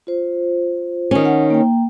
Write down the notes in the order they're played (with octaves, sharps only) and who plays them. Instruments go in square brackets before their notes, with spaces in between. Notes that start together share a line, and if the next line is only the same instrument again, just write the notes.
[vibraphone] F4 C5
[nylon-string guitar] D#3 C#4
[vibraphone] F#5
A#3 G5